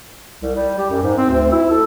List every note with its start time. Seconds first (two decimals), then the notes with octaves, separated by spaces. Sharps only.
0.42 C2
0.56 G3
0.78 G4
0.90 F#2
1.03 G#2
1.18 C4
1.30 D2
1.52 E4
1.71 A4